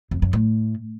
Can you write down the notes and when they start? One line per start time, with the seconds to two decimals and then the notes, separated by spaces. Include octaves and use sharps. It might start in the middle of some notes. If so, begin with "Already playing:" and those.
0.11 F2
0.22 F#2
0.33 A2